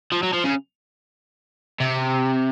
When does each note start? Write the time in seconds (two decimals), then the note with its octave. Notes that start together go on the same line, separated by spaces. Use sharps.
0.12 F3
0.23 F#3
0.33 F3
0.44 C#3
1.80 C3